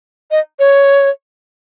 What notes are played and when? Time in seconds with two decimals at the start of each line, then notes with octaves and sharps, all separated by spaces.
0.31 D#5
0.59 C#5